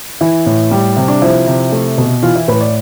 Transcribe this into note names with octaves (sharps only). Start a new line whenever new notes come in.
E3 E4
A2
G3
C3
D4
F3 E4
C3
A3
B2
E3 F4
E4
A2 B4
D5